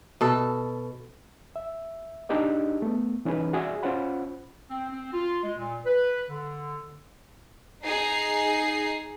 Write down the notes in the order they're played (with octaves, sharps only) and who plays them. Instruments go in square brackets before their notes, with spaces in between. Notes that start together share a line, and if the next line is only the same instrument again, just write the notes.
[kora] B2 A4
[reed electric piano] E5
D4 D#4 G4 G#4 D#5
A3 B3
E3 C#4 D#4 G#4 B4
F#4 G#4 D5 E5
C#4 F4 C5 C#5 F#5 B5
[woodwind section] C4
C4
F4
G#3
A#2
B4
D3
[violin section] D#4 G#4 C7